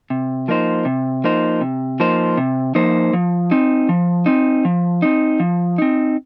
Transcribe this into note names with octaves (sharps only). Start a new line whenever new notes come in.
C3
F3 A#3 D#4 C5
C3
F3 A#3 D#4 C5
C3
F3 A#3 D#4 C5
C3
F3 A#3 D#4 C5
F3
C4 D#4
F3
C4 D#4
F3
C4 D#4
F3
C4 D#4